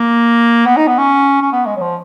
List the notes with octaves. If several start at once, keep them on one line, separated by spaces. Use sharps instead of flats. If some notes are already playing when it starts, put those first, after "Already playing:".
Already playing: A#3
B3
D#4
B3
C#4
C#4
B3
G#3
F#3
F3